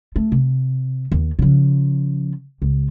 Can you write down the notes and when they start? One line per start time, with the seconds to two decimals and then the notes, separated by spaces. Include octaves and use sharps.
0.16 A3
0.32 C3
1.12 D#2
1.39 C#3 F3
2.62 C#2